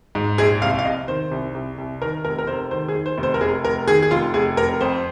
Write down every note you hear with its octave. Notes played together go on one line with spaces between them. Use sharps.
G#2
A#1 G#4
C2 F5
F5
C3 D#5
D#3 C5
C2
C2
C2
D#3 A#4
F1 A#4
A#4
F1 C5
D#3 C5
G#4
D#3
C5
F1
C5
A#4
F1 G#4
F1 A#4
D#3 G#4
G#4
F1 F4
F1 G#4
F1 A#4
F2 C5